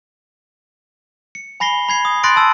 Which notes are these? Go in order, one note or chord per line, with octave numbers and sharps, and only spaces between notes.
C#7
G#5 B5 A#6 C7 G7
B5 G#6 C7
D#6
B5 C6 F#6 A6 A#6 D7
A5 E6